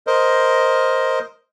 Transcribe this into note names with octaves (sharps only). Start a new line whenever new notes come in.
A#4 C5 D#5